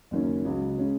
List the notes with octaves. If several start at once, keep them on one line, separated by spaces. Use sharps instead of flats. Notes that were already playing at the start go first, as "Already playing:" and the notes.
F#1 F#2 D#3 A#3 C#4
C#2 C#3 F#3
C#3 G#3 C#4